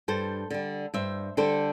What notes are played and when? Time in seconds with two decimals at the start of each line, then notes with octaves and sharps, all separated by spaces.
0.08 G2 A4 C5
0.50 D3 G3
0.94 G2 C5 E5
1.37 D3 G3 A4 C5